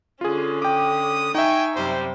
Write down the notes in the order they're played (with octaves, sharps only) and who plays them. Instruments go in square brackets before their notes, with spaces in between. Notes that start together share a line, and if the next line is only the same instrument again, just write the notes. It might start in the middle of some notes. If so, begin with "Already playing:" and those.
[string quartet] D3 C#4 [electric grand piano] F4 G#4
[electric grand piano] G5 D6 [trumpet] D#6
[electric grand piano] D#4 E5 [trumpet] G5 [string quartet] G#5 C#6
[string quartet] F#2 C3 G3 [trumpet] C5